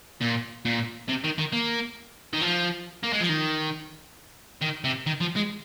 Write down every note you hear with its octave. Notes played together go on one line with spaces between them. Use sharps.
A#2
A#2
C3
D#3
D#3
A#3
D#3
F3
A#3
G#3
F3
D#3
D#3
C3
D#3
F3
G#3